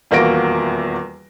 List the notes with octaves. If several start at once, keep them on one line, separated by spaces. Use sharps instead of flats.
D#1 E2 A#3 F#4 A#6 D7